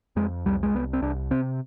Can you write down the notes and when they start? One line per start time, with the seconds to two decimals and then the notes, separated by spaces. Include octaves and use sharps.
0.16 F2 G#3
0.45 C2 G3
0.63 G#3
0.74 C2 B3
0.93 C4
1.02 C2 D4
1.31 C3 C4